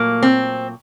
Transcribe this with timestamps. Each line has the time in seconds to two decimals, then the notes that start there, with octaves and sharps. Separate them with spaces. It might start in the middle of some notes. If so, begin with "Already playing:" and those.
Already playing: A#2 F#3 A3 A#3
0.23 C4